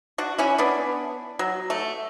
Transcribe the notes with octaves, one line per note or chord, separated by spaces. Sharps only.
D4 F#4
C#4 E4
B3 D4
F#3
A3